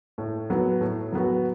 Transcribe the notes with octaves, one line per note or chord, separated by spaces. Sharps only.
A2
F#3 B3
A2
F#3 B3 F#4